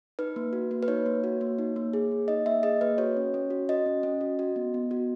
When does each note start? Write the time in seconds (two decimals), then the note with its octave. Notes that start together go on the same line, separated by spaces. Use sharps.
0.19 D#4 B4
0.36 A#3
0.53 F#4
0.71 A#3
0.83 B4
0.88 D#4 C#5
1.06 A#3
1.24 F#4
1.41 A#3
1.58 D#4
1.76 A#3
1.93 G#4
2.11 A#3
2.28 D#4 D#5
2.46 A#3 E5
2.63 G#4 D#5
2.81 A#3 B4
2.98 F#4 C#5
3.17 C#4
3.34 C#4
3.50 F#4
3.69 F#4 D#5
3.86 C#4
4.03 C#4
4.21 F#4
4.39 F#4
4.56 B3
4.74 B3
4.91 F#4